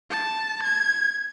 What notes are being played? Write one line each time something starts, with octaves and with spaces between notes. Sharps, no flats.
A5
G#6